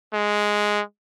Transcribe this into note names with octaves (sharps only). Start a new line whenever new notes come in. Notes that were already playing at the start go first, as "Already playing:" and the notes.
G#3